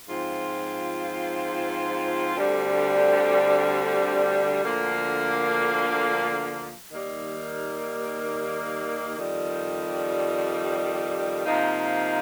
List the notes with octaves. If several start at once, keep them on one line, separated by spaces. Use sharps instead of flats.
G#2 F3 C4 F4
D2 D3 G3 C4
D2 D3 F3 A#3
D#2 D#3 G3 A#3
F2 D#3 G3
C3 F3 A#3 D#4